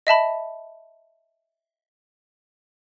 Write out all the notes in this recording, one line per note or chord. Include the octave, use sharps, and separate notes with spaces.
D#5 E5 A5 B5